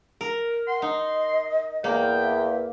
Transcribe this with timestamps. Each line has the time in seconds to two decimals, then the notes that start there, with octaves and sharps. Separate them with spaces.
0.21 A#4
0.68 F#5 C6
0.82 D#4 D#5
1.84 E2 A#3 G5
2.14 E5